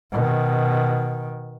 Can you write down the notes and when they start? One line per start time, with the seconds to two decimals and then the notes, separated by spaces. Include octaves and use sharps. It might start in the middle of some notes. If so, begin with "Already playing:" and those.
0.12 B2 D#3